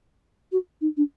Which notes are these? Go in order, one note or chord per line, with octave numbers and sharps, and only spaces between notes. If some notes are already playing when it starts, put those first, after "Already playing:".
F#4
D#4
D4